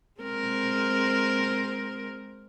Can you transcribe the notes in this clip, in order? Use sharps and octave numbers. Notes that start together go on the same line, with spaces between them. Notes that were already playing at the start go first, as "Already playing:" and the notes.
G#3 C4 A#4